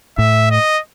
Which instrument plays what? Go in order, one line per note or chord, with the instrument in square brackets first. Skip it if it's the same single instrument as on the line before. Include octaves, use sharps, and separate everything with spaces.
[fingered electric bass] A2 [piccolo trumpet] E5
[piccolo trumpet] D#5